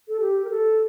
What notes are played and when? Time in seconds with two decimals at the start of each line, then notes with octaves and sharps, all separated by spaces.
0.08 A4
0.20 G4
0.44 A#4
0.50 A4